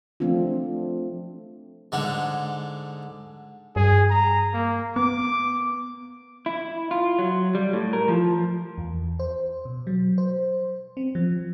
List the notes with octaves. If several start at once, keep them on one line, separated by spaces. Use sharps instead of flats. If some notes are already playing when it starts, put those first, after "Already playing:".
F3 A3 C4 D4 F4
G#2 D3 G#3
G2 G#4
A#5
A#3
B3 D6
E4
F4
F#3
G3
A2
A#4
F3
E2
C5
B2
F#3
C5
C4
F3